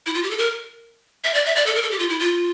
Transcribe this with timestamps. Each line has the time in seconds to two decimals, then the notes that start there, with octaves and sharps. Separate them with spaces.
0.06 E4
0.14 F4
0.23 G4
0.30 A4
0.38 A#4
1.24 E5
1.34 D5
1.45 E5
1.56 D5
1.66 A4
1.75 A#4
1.82 A4
1.91 G4
1.99 F4
2.09 E4
2.19 F4